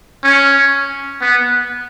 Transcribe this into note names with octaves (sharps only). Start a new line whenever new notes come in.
C#4
B3